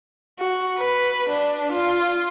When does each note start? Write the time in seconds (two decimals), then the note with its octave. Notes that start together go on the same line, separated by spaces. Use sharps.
0.39 F#4
0.79 B4
1.30 D4
1.72 F4